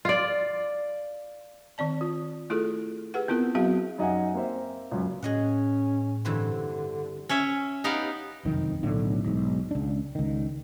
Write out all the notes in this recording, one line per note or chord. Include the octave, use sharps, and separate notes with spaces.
F4 D5
D#3 C4 D5 A5
F4
A3 E4 F4 G#4 A4
G4 G#4 B4 F#5
B3 C4 E4 F4 A#4
F#3 B3 C4 F#4 G#4 F5
F#2 D#4 D#5 E5 F#5 G#5
A#3 C4 C5 E5
C#2 F#2
A2 C#4 G#4 D#5 F#5
G2 D3 E3 C4
C#4 C#5 E5
B3 D#4 G4 F5 F#5
F#1 C2 F2 D#3
B1 A2 D3 A3
B1 G#2
C#2 D4
C#2 D#3